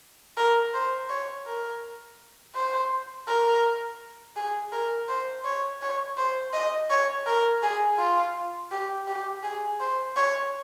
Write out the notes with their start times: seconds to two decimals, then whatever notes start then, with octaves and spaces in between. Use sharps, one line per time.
0.37 A#4
0.74 C5
1.09 C#5
1.46 A#4
2.55 C5
3.27 A#4
4.36 G#4
4.72 A#4
5.09 C5
5.44 C#5
5.82 C#5
6.17 C5
6.53 D#5
6.90 C#5
7.26 A#4
7.63 G#4
7.99 F4
8.71 G4
9.08 G4
9.43 G#4
9.80 C5
10.16 C#5